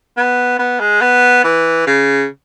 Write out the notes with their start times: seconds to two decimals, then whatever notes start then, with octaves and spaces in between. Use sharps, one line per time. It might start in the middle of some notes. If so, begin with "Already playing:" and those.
0.17 B3
0.59 B3
0.80 G#3
1.01 B3
1.44 E3
1.87 C#3